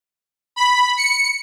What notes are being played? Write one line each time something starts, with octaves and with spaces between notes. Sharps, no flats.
B5
C#7